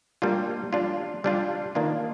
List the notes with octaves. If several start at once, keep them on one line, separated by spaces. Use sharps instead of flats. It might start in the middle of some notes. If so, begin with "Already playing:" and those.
G3 A#3 D4 F4
G3 D4 F4
G3 D4 F4
D#3 A#3 D4 F4